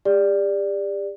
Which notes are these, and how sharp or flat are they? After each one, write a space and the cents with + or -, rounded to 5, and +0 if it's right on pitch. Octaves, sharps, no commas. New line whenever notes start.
G4 +40 D5 +0